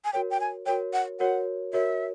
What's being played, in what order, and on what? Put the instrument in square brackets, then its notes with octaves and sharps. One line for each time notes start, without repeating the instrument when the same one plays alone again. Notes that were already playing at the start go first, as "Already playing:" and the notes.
[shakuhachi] G#5
[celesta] F#4 A#4 C#5 [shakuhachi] G5
[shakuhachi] G5
G#5
[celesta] F#4 A#4 C#5 [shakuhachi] G5
[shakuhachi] F#5
[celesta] F#4 A#4 C#5 [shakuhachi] F#5
[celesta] F#4 A#4 C#5 [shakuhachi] E5